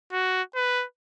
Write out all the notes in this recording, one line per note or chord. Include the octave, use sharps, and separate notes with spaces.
F#4
B4